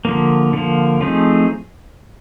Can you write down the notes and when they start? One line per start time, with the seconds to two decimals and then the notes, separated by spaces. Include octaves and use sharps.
0.05 D3 F3 A#3
0.53 D3 F3 A#3
1.01 F3 A3 C4 D#4 G#4